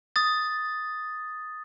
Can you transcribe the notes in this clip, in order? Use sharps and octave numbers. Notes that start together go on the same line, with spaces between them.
D#6 A6